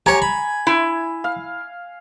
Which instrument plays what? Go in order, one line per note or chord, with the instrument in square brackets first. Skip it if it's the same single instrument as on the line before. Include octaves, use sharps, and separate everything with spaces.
[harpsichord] G4 C#5 [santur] G#5 [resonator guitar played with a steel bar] A#5
[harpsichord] B5
[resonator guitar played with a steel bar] E4
[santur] F5